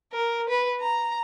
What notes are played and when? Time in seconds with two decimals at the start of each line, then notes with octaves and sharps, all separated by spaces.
0.13 A#4
0.49 B4
0.81 A#5